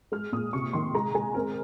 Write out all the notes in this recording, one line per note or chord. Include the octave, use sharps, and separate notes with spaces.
G#3 F6
A#2 D#6
C3 C#6
D#3 C6
G#3 A#5
G#3 G#5
C4 A#4